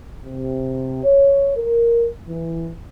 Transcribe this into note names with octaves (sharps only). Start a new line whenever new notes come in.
C3
C#5
A#4
E3